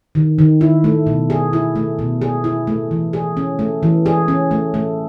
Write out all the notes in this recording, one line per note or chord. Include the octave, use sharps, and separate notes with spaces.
D#3
D#3
E4
A3
B2
G#4
E4
A3
B2
G#4
E4
A3
E3
G#4
C#4
A3
E3
G#4
C#4
A3
A3